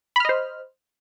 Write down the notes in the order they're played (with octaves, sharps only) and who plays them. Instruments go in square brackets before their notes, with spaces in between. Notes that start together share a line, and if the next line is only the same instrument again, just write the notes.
[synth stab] B5
F6
D#5
C5